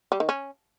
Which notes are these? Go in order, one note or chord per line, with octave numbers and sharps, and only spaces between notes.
G3
D#3
C#4